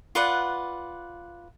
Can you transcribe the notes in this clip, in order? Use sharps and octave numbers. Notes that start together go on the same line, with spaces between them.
F4 B4 D5 F#5